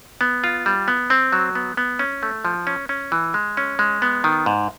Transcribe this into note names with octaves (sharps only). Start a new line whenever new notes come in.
B3
F4
G3
B3
C4
F#3
B3
B3
C#4
A3
F3
C#4
C#4
E3
G#3
C#4
G#3
B3
D#3
G#2